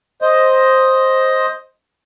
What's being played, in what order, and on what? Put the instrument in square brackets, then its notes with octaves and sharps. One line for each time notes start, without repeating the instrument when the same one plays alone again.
[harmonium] C5 D#5